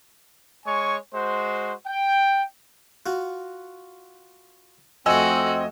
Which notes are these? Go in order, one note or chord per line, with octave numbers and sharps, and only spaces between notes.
G#3 C#5 G#5 C#6
G#3 F#4 C5
G5
F4 F#4
F2 A3 C4 F#4 D#5 G#5 E6